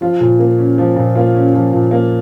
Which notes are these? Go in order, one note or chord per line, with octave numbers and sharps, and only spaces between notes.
F3 F4
A#2
A#3
C#4
F3
A#2
A#3 F4
C#4
F3
A#2
A#3